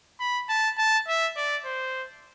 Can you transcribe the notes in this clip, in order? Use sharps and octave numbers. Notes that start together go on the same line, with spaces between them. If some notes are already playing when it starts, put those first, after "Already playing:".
B5
A5
A5
E5
D5
C5